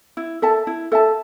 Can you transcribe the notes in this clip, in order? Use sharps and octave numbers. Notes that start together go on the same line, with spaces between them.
E4
A4 E5 A5
E4
A4 E5 A5